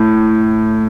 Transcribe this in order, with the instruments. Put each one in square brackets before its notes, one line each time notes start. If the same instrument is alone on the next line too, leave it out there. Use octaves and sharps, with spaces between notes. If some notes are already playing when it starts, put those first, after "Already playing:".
Already playing: [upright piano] A2